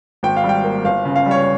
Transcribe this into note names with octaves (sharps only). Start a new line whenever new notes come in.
G#1 G5
F5
G3
G5
A#3
G1 F5
C#3
F5
G3
C#5